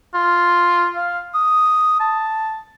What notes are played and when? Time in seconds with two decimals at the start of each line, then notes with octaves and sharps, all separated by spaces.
0.14 F4
0.96 F5
1.35 D#6
2.00 A5